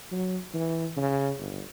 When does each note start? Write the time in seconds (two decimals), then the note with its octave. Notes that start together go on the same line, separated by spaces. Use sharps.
0.12 F#3
0.54 E3
0.97 C#3
1.39 G1